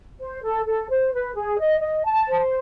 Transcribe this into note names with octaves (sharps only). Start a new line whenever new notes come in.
C5
A4
A4
C5
B4
G#4
D#5
D#5
A5
C5